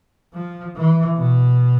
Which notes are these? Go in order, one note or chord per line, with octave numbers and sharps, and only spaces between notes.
F3
E3
B2